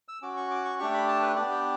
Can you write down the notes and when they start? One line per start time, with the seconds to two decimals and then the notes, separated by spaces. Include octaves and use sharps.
0.08 E6
0.22 C#4 F#4 D6
0.37 C#6
0.51 D6
0.65 C#6
0.79 A3 D4 G4 C#6
0.94 B5
1.08 A5
1.22 B4
1.36 B3 D4 G4 D5
1.51 G5